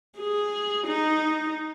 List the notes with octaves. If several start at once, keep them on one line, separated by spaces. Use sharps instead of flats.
G#4
D#4